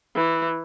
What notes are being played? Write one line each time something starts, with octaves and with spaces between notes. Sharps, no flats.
E3